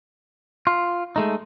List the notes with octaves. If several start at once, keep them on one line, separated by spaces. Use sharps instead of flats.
F4
G#3 A3 D#4